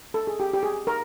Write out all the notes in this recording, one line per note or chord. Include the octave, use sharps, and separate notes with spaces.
A4
G#4
G4
G4
G#4
A#4